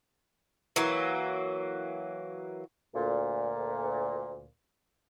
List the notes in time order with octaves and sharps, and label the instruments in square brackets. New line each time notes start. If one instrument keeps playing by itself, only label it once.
[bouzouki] E3 F#3 A#3
[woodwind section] D2 A#2